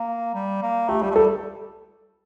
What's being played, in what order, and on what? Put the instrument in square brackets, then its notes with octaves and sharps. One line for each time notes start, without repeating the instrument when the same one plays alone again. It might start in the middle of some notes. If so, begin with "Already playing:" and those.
Already playing: [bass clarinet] A#3
G3
A#3
[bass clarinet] A3 [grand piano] G4
[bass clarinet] G3 [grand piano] G4
[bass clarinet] A3
[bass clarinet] G3 [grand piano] A4